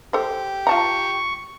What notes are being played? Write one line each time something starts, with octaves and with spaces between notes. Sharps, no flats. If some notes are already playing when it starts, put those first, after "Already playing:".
G4 A4 C5
F4 A5 A#5 C#6